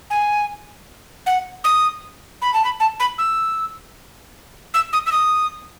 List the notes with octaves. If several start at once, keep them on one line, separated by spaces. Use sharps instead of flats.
G#5
F#5
D#6
B5
A5
B5
A5
B5
E6
E6
D#6
E6
D#6